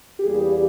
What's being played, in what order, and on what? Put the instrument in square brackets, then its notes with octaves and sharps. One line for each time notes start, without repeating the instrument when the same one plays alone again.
[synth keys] G4
[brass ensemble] E2 C#3 E3 G3 A#3 [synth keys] G#4
[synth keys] G4